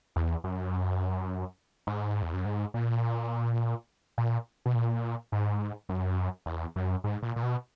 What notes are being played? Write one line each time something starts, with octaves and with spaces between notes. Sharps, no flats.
E2
F#2
G#2
E2
F#2
G#2
A#2
A#2
B2
A#2
G#2
F#2
E2
F#2
G#2
A#2
A#2
B2